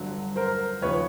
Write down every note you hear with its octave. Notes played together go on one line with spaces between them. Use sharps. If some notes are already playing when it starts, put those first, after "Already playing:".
Already playing: G1 G2 D3 F#3
A#4 C5
D#2 C#3 F3 B4 C#5